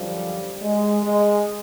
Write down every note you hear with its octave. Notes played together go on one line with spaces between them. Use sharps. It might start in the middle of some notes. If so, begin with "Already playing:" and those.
Already playing: F#2 D3 F3 G3
G#3
G#3